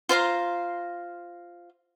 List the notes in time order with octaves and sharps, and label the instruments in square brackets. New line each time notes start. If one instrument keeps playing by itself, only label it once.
[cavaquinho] F4 C5 F5 A#5